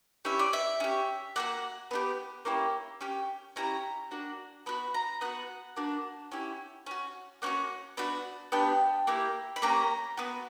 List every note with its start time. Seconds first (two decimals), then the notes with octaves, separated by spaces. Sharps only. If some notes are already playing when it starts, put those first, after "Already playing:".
0.25 C#4 E4 G4 E5
0.39 D5
0.53 E5
0.80 C#4 G4
1.36 A#3 D4 F#4 F#5
1.91 B3 D4 G4
2.45 A#3 C#4 E4 G4
3.01 C#4 G4
3.56 C#4 E4 G4 A#5
4.11 A#3 D4 F#4
4.66 B3 F#4 B5
4.94 A#5
5.21 B3 F#4 F#5
5.76 A#3 D4 F#4
6.32 C#4 E4 G4
6.86 C#4 F#4
7.42 A#3 C#4 F#4 F#5
7.97 B3 D4 F#4
8.52 B3 D4 G4 G5
9.07 A#3 E4 G4
9.56 B5
9.62 A#3 C#4 G4 A#5
10.17 B3 F#4